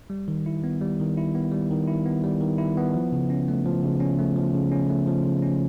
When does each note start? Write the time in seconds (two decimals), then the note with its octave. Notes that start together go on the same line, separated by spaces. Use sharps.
0.10 G3
0.28 D#3
0.46 E4
0.64 B3
0.81 G3
1.00 D#3
1.17 E4
1.35 B3
1.52 G3
1.71 D#3
1.88 E4
2.06 B3
2.23 G3
2.40 D#3
2.58 E4
2.77 B3
2.94 F3
3.13 C#3
3.30 C#4
3.48 A3
3.66 F3
3.83 C#3
4.00 C#4
4.19 A3
4.36 F3
4.55 C#3
4.72 C#4
4.89 A3
5.07 F3
5.26 C#3
5.42 C#4